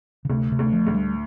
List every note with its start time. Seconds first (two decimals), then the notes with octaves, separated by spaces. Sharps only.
0.25 C#3
0.30 D2 C3
0.52 C3
0.59 D2
0.73 F3
0.87 D2
0.94 G3